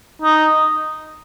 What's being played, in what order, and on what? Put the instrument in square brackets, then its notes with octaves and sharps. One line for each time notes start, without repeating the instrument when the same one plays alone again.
[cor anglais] D#4